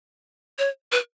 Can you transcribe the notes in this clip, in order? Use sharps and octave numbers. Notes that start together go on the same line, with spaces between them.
C#5
B4